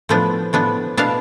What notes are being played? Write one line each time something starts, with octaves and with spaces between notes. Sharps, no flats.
A2 F3 B3 D4
A2 F3 B3 D4
B2 B3 D4 F5 A5